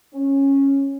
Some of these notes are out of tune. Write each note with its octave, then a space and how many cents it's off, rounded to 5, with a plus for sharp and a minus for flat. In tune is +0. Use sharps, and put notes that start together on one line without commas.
C#4 -10